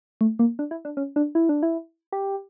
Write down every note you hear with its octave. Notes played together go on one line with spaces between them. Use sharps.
A3
A#3
D4
E4
D4
C#4
D4
E4
D4
E4
G4